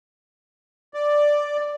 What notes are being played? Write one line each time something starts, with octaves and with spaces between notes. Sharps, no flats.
D5